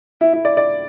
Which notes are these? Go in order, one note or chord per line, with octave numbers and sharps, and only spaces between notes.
E4
E4
D5
D5